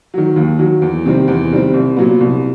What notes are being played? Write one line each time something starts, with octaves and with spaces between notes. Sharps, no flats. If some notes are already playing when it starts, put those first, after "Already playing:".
D#3 F#3
D#2
D#3 F#3
E2
C3 D#3 G3 C4
E2
C3 D#3 G3 C4
C2
A#2 F#3 B3
C2